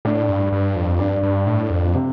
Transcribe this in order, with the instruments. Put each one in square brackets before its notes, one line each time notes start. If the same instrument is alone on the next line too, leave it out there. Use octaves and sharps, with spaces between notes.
[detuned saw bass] A2 [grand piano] D4
[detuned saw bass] G2
G2
F2
[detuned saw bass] G2 [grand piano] D4
[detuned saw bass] G2
A2
F2
[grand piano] C3